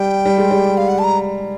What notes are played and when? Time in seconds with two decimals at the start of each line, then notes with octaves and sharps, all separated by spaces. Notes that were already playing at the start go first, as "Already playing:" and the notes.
Already playing: G3 G5
0.26 G3
0.38 G#3
0.51 G3
0.78 F5
0.88 F#5
0.99 A5
1.04 A#5